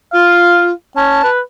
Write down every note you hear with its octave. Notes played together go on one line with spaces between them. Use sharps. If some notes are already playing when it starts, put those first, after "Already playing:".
F4 F5
C#4 A5
B4